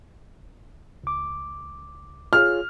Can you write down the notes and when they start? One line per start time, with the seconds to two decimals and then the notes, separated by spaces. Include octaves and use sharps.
1.04 C#2 D6
2.33 F4 G#4 C#5 F6